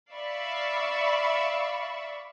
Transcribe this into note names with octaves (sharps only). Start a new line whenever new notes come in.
D5 E5 F5 B5 C#6 E6